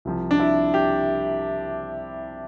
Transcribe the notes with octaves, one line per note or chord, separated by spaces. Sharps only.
C2 C3 F3
D4
E4
G4